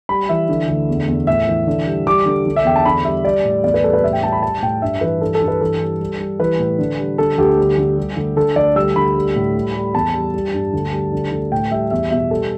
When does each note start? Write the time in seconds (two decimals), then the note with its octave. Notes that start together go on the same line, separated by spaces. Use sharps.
0.09 G3 B5
0.29 E3 E5
0.49 D3
0.68 D2
0.89 E2
1.08 E2
1.27 A2 E5
1.47 E3
1.67 D3
1.86 G3
2.07 G3 D6
2.26 D3
2.46 D3
2.56 E5
2.65 E2 G5
2.76 A5
2.85 D3 B5
3.05 G3 E5
3.24 G3 D5
3.44 A2
3.64 E2 D5
3.74 B4
3.84 G3 A4
3.93 B4
4.03 A2 E5
4.13 G5
4.23 G3 A5
4.32 B5
4.42 G3 A5
4.62 A2 G5
4.82 G2 E5
5.01 E3 B4
5.21 G2 A4
5.35 A4
5.42 G2
5.48 B4
5.61 E3 A4
5.81 G3
6.00 G3
6.20 G3
6.39 E3 B4
6.59 A2
6.79 D3
6.98 G3
7.18 D3 A4
7.38 D2 G4
7.57 G3
7.78 D3
7.97 G3
8.17 D2
8.37 D3 A4
8.56 D2 D5
8.76 G3 E6
8.96 D2 B5
9.15 G3
9.36 A2
9.55 G3
9.75 G3
9.94 E2 A5
10.15 G3
10.34 G3
10.54 G2
10.73 D2
10.92 G3
11.12 D3
11.32 D2
11.52 A2 G5
11.71 G3 E5
11.91 E2 E5
12.11 B2 E5
12.31 G3 A4